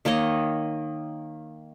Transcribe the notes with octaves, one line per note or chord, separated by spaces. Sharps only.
D#3 A#3 C#5 D#5